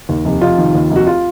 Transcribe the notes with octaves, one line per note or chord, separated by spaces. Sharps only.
D#2
F1
F1 F4
D#3
D#2
F1
F#4
F4